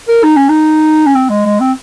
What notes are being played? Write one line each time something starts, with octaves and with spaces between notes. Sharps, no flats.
A#4
D#4
C#4
D#4
C#4
C4
G#3
G#3
C4